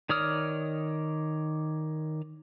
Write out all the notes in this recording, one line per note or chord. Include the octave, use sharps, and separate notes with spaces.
D#3 C#5 D5 D#6 F6